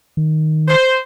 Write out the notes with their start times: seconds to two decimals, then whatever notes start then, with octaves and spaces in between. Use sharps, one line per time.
0.17 D#3
0.68 C5